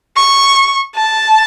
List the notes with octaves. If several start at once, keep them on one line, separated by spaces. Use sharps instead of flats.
C#6
A5